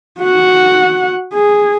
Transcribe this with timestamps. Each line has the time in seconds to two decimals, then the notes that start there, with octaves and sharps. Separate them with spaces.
0.20 F#4 F#5
1.34 G#4